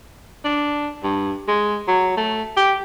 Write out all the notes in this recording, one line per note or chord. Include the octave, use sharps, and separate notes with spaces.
D4
G2
G#3
F#3
A3
G4